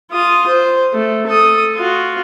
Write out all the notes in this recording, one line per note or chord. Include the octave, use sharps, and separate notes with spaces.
F4 D#6
C5
A3
A4 D#6
F4 F#4